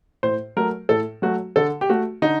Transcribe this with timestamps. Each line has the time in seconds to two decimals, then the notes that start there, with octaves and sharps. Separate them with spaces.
0.23 A2 C5
0.56 F#3 A3 A#4
0.89 A2 A4
1.22 F#3 A3 F#4
1.56 D3 A4
1.81 G4
1.89 A3 F#4
2.22 D3 D#4